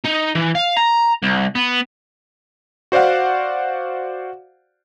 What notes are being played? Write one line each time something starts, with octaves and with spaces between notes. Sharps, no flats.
D#4
E3
F5
A#5
C2
B3
F#4 C5 D5 F5 F#5